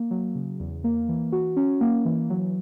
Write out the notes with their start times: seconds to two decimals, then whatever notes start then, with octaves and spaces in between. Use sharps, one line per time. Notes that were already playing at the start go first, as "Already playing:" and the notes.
Already playing: A#3
0.11 F#3
0.35 C#3
0.60 E2
0.84 A#3
1.09 E3
1.32 F#4
1.56 C#4
1.81 A#3
2.05 E3
2.30 F#3